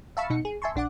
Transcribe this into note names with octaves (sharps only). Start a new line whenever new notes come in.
E5 F5 A5 B5 C#6 E6
B2 D#4 C#7
G#4
E5 G#5 A5 C6 C#6
A#1 D4 F#5 D6